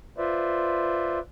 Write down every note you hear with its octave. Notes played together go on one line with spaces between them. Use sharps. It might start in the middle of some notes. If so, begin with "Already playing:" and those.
F4 B4 C5 D5 E5